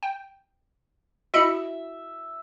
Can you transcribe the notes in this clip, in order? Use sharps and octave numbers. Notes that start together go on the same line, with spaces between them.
G5
E4 F#4 D#5 E5 B5 C#7